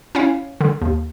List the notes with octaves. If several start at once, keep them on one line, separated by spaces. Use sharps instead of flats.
C#4 E4 C#5 F5
D3
D#2